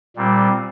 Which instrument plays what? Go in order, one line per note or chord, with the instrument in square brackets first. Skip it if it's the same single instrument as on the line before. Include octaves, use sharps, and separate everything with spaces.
[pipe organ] A#2 G3 C4